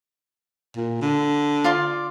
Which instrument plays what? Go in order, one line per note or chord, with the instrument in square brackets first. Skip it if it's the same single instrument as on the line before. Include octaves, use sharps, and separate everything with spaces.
[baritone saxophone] A#2
D3
[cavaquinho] F4 D5 C6